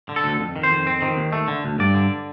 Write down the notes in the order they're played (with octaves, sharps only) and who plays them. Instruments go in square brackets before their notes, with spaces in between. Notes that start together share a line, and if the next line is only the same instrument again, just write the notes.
[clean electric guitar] D3
A4
D2
F2
D#3
C5
F2
C4
D#3
D#2
A3
D3
D2
G2 D5
D3